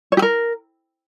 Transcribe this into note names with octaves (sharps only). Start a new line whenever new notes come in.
C#5
G4
A#4